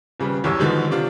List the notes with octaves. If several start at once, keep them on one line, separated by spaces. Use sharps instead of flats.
D#1 C#3 G3 B4
B1 E2 G2 C#5 E6
B2 D3 D#3 F3 G#3
C3 D4 F4